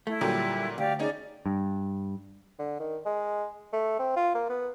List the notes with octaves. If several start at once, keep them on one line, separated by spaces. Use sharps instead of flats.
A3 E4
A#2 D3 F#3 G3
D2 G4 D5 F5
C#4 D#4 G#4 D5
G2
D3
D#3
G#3
A3
C4
F4
A#3
B3